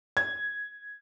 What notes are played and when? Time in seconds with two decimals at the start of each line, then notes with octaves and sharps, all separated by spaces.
0.17 G#6